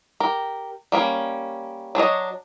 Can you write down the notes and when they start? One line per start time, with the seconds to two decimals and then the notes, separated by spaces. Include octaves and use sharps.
0.20 G4 A#4
0.92 G3 A#3 C#4
1.95 F#3 D4 C#5 D#5